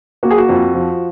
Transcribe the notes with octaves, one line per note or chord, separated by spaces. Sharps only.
A#3 F#4
G#4
F#4
F2
F3